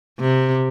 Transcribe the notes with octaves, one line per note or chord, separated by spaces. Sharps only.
C3